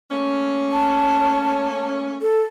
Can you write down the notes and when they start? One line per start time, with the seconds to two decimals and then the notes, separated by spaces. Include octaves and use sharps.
0.11 A3 A#3 C#4
0.72 A5
2.22 A4